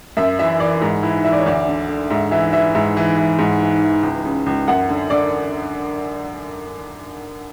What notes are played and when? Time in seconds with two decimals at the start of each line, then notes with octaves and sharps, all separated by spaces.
0.17 F#2 E5
0.39 E3 E5
0.60 E3 D5
0.81 G#2
1.03 E3 E4
1.24 E3 E5
1.32 D5
1.39 C#5
1.46 D2 D5
1.67 D3
1.88 D3
2.10 G#2 E5
2.31 E3 E5
2.53 E3 E5
2.75 G#2 E5
2.97 E3
3.17 E3
3.38 G#2
3.60 E3
3.82 E3
4.03 C#2
4.25 C#3
4.46 C#2
4.68 F#2 F#5
4.89 D3
5.10 D3 D5